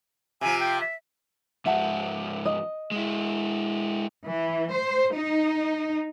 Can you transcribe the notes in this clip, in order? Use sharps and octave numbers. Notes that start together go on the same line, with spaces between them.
C3 F3 G#5
G5
E5
G#2 F3 E5 F#5 A5
D#5
G#3 E4
E3
C5
D#4